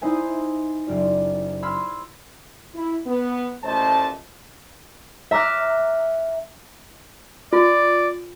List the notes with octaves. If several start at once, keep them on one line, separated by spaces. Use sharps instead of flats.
D#4 E4 C5 D#5 E5 G#5
F#1 F4 D5
B5 C6 E6 F6 G#6
E4
B3
A1 A#2 A3 C5 D#5 A5
E5 A#5 D6 F6 F#6
F4 D5